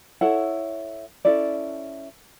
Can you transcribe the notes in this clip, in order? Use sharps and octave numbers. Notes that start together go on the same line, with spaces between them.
E4 A4 C#5 F#5
C#4 E4 A4 D5